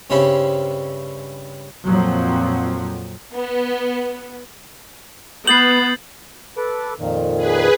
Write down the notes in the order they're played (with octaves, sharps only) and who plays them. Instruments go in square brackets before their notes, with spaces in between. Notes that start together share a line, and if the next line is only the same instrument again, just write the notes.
[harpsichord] G2 C#3 C4 C#4 E4
[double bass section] F2 A#2 F3 F#3 C4
[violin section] B3
[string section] B3 [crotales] G6 A6 C7 [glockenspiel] F#7
[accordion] A4 B4 D6
F2 A#2 D#3
[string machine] G#4 B4